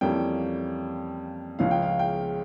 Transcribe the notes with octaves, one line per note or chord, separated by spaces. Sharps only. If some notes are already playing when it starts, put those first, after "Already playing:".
F2 E3 G3 A#3 C#4 G5
C#2 C#3 F3 C#4 F5
G5
F5
G5